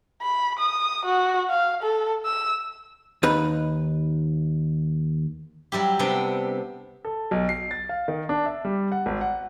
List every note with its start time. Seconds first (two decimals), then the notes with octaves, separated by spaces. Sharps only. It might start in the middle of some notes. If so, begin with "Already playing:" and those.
0.22 B5
0.59 D#6
1.06 F#4
1.50 F5
1.83 A4
2.26 E6
3.23 D#2 D#4 B4
5.72 F#3 G3 E4 G4
5.99 C3 B3 D4 G5
7.05 A4
7.31 B1
7.49 C7
7.71 A6
7.89 F5
8.08 D#3
8.29 D4
8.46 E5
8.65 G3
8.92 F#5
9.06 G#1
9.21 F#5